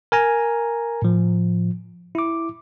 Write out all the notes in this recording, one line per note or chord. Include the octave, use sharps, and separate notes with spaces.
A#4 G#5 A#5
A2 F3
E4 D6